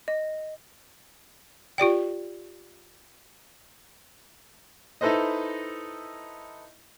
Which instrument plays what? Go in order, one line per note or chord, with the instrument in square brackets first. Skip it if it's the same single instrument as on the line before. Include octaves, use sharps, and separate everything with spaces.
[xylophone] D#5
[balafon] F4 G4 D5 G5
[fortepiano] D#4 E4 A4 B4 C5 D#5